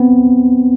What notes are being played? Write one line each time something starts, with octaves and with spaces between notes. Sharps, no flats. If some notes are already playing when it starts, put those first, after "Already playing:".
Already playing: B3 C4